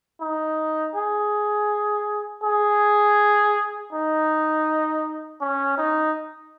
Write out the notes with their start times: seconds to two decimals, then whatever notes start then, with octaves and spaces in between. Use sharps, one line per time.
0.21 D#4
0.96 G#4
2.44 G#4
3.93 D#4
5.41 C#4
5.78 D#4